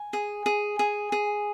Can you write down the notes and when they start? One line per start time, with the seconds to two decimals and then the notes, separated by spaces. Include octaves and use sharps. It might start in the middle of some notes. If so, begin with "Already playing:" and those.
Already playing: G#5
0.13 G#4
0.46 G#4
0.79 G#4
1.12 G#4